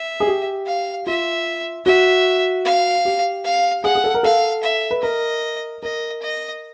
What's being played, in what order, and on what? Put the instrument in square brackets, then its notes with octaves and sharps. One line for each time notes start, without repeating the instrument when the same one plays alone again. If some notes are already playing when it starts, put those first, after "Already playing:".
Already playing: [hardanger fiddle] E5
[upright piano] G#4
G4
[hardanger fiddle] F5
[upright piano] F4 [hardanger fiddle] E5
[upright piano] F#4 [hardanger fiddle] E5
[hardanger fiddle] F5
[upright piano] G4
[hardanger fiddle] F5
[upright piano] G#4 [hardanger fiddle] F#5
[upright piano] G#4
A4
A#4
[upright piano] A4 [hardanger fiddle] F5
[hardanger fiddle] E5
[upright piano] B4
[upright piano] A#4 [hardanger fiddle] D#5
[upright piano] A#4 [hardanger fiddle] D#5
[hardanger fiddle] D#5